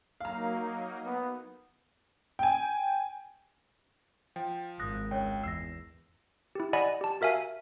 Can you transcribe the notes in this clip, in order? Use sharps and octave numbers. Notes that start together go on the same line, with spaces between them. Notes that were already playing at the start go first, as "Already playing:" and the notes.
F#3 A#3 D#4 F5 A#5
B3
G5 G#5
F3 G5
G#1 D#6 F#6 A#6
C#2 C#5 G5
E2 E6 A#6 C7
E4 G4
D5 D#5 F#5 G#5 B5
G4 A5
F#4 A#4 E5 F5 G#5